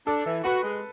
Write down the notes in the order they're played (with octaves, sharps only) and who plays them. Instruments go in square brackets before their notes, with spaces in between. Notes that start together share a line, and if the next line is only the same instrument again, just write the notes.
[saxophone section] D4 [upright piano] A4
[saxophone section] E3
[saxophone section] F#4 [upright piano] B4
[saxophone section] G#3